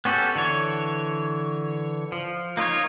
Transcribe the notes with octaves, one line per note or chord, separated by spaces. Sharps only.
B3 C#4 F#4 G4 A4
D3 E3 C#5
F3
A#3 D#4 F4 C#5